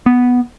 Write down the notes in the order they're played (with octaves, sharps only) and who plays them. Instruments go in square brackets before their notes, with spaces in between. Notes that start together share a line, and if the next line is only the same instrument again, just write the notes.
[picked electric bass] B3